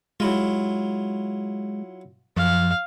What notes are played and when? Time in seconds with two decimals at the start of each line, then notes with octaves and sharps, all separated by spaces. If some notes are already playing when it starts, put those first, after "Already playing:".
0.20 F#3 G#3 E4 F4
2.37 F#2 F3 F5